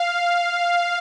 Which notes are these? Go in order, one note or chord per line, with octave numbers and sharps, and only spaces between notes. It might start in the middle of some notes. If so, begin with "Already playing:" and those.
Already playing: F5